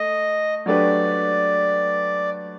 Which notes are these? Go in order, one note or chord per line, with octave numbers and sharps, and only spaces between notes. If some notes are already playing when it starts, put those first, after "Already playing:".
Already playing: A3 D#5
F#3 A3 D4 G4 B4 D5